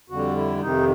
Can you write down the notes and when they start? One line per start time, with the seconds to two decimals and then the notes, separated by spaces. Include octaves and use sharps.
0.10 F2 D3 G3 F#4
0.36 E4
0.61 F2 C3 D#3 D#4